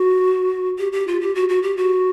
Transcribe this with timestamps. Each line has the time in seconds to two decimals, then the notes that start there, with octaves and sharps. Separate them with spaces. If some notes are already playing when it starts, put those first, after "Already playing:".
Already playing: F#4
0.79 G4
0.92 G4
1.08 F4
1.21 G4
1.35 F#4
1.49 F#4
1.63 G4
1.77 F#4